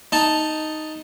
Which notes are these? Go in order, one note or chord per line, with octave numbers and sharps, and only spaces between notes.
D#4 A5